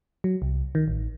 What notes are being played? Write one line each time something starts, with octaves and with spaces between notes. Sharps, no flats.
F#3
C2
D#3
A1